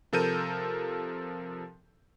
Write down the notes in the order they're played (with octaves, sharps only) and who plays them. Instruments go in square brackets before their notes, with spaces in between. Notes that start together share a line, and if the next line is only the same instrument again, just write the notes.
[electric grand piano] C3 F3 A4 A#4 G6 D#7